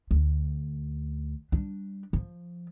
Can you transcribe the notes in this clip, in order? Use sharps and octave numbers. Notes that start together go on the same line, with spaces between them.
D2
G3 D4
F3